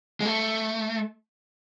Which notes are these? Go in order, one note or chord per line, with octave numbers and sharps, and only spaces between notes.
G#3
A3